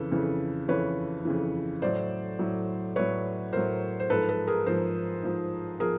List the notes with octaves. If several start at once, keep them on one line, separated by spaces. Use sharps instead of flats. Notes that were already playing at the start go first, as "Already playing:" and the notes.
Already playing: F2 C#3 E3 A4 B4
F2 C#3 E3
F2 C#3 E3 B4 C#5
F2 C#3 E3
A2 F#3 C5 D5
A2 F#3
A2 F#3 B4 C#5
A2 F#3 A#4 C5
C5
G#2 F3 A4 B4
A4 B4
G#4 A#4
G#2 F3 A#4 C5
G#2 F3
F3 G#4 A#4